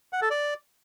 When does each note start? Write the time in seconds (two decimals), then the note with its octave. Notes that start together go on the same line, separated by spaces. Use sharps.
0.13 F#5
0.22 A4
0.30 D5